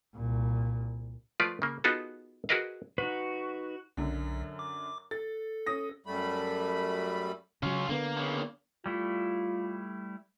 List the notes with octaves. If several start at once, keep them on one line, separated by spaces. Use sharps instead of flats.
C2 A#2
F3 A3 F4 B4 D5
C#3 A#3
B3 D#4 F4 F#4 G#4 A4
F#4 G#4 A#4 B4 D#5 F5
D#4 F#4 B4
B1 F#2 D3
D6
A4 A6
C#4 D#6 A#6
F#2 G3 A3 B5
C#3 F#3 C#4 F4
D3 A#3 B3
C#3 A#3
G3 A3 E4 F4